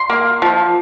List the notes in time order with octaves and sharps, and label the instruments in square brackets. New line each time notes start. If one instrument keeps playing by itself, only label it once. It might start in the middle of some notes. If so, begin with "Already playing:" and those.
Already playing: [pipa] C6
A#3
F3